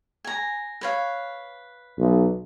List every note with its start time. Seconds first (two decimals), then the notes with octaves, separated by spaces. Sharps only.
0.25 G#5 A#5
0.81 B4 C#5 F5
1.98 B1